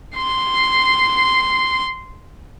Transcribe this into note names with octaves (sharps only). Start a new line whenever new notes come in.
C6 C7